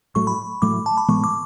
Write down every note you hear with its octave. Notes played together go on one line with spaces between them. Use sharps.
A2 F#3 A3 C#6
B5
A2 F#3 A3 D6
A5
B5
A2 E3 G#3 B3 C#6
D6